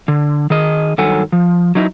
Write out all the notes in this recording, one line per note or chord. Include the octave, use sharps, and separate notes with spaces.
D3
D#3 G#4 D#5
G2 D#3 F#3 A4 F#5 G#5
F3
F#3 D#4 E4